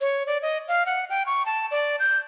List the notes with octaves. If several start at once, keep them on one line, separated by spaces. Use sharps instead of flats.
C#5
D5
D#5
F5
F#5
G5
C#6
A5
D5
G6